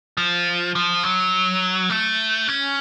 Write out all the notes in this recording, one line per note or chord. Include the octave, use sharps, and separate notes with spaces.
F3
F3
F#3
A3
C#4